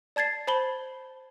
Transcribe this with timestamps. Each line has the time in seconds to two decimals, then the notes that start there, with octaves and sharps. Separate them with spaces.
0.16 D5 A5 G#6 A6 C7
0.47 C5 A5 B5 G7